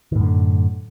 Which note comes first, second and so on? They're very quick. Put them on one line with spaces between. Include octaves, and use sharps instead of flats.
D#3 A2 F#2 D3